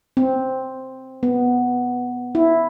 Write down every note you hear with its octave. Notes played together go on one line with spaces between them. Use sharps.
C4
B3
E4